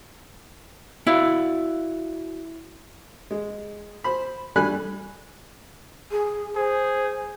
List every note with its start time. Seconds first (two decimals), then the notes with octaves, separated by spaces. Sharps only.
1.07 E4 F#4 D5 F5
3.31 G#3
4.04 C5 B5
4.56 G3 A3 D4 G#5 B5 F#6
6.11 G#4
6.56 G#4 C5